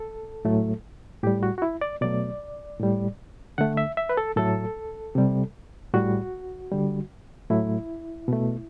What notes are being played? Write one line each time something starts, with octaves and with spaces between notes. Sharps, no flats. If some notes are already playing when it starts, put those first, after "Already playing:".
Already playing: A4
A2 F#3 A3
A2 G3 G4
F#4
F#4
E4
D5
B2 F#3 A3 D5
A2 G3
D3 A3 F#5
E5
E5
B4
A4
A2 F#3 A3 A4
C3 G3
A2 G3 F#4
D3 G3
A2 F#3 A3 E4
B2 A3